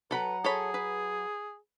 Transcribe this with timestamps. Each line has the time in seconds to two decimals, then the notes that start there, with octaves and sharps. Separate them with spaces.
0.11 F#3 A4 B4 F#5 A#5 B5
0.44 G#4 A4 C#5 B5
0.74 B4